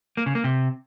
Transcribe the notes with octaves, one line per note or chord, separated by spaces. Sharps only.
A#3
C#3
A#3
C3